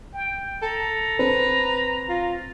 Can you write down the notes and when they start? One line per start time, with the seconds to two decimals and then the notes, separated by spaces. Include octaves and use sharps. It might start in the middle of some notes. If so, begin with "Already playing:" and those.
0.13 G5
0.62 A4 A#5
1.19 C4 B4
2.09 F4